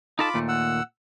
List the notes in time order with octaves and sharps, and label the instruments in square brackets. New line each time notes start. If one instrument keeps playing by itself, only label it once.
[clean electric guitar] D#4 A4 A5 [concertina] F4 B5 D6
[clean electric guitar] D#2 A#2 A3
[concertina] F#5 E6